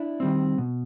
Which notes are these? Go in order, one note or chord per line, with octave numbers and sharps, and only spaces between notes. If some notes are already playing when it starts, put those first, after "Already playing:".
Already playing: D4 E4
D#3 G3 C4
B2